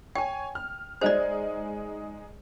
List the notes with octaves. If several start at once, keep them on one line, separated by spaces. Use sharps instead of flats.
C#5 G5 G#5
F6
G#3 D#4 G#4 C5 D5